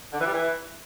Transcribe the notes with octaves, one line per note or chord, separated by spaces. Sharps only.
D3
E3
G3
E3